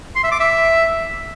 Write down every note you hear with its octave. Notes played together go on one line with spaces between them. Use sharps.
C6
E5
D6
E5